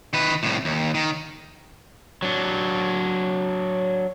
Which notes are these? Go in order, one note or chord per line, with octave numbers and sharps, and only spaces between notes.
D#3 B4
C2 A2
D#2
D#3
F#3 D4